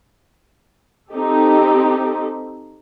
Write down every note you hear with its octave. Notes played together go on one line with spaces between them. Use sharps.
C4 D#4 G4 A4